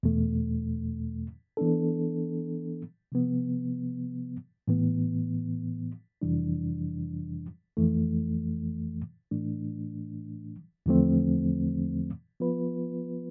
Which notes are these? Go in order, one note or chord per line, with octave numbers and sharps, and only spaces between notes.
E2 B2 A3
E3 B3 D4 A4
C3 F3 B3
A2 E3 B3
F2 C3 E3 G3 D4
F2 E3 A3
A2 E3 A3 D4
E2 D3 F3 A3 C4
F3 B3 F4 B4